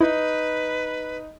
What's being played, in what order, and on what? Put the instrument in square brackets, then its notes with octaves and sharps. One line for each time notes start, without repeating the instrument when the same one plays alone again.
[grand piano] D#4 [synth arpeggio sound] E4 [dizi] B4